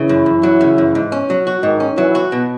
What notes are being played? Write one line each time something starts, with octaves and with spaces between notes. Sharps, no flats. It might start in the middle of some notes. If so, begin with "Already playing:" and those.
Already playing: C#3 E3 E4
F#2
F#2
F#3
C#3
F#2
G#2
C#4
F#3
F#4
G#2 D#3 D#4
C#4
E3 F#3 E4
F#4
B2